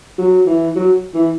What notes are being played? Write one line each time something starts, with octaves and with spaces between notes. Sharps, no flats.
F#3
E3
F#3
E3